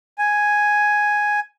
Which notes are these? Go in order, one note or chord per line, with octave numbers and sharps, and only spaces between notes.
G#5